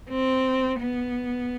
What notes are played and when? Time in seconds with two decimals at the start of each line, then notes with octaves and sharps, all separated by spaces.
0.10 C4
0.80 B3